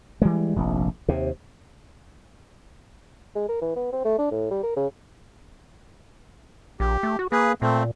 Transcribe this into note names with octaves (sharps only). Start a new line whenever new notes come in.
E3 G3 G#3
F1 A#1
D#2 C3
G#3
A#4
E3
B3
C4
A3
D4
A2
G3
A#4
C#3
A#1 G4
A3
F#4
A#3 G#4 B4
A#2 A3 C4